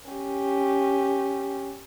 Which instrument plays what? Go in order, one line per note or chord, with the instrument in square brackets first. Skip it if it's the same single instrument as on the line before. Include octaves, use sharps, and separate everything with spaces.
[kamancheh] C#4 G4